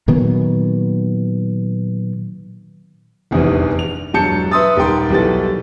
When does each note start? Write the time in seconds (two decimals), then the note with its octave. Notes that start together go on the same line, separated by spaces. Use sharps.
0.08 A#2 D#3 F#3 B3
3.31 F1 A#1 E2 G2 D#3 E3
3.79 F7
4.13 E1 G2 F#3 A5 G6 C#7
4.51 B4 E5 C6 D#6 E6 A6
4.76 D#1 D#3 A#4 G5 C6
5.10 B1 E3 G3 A4 A6